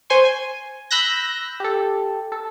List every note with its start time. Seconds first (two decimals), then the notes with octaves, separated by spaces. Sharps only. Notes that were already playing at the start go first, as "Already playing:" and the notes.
0.10 C5 G#5 C6 C#6
0.25 G#5
0.91 B5 E6 F#6 G6 A#6
1.60 G4 A4
2.32 A4